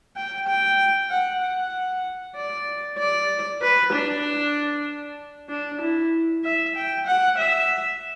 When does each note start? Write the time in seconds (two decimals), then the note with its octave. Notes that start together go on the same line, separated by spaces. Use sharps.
0.16 G5
0.48 G5
1.10 F#5
1.42 F#5
2.36 D5
2.99 D5
3.62 B4
3.93 D4
5.50 D4
5.81 E4
6.44 E5
6.76 G5
7.07 F#5
7.38 E5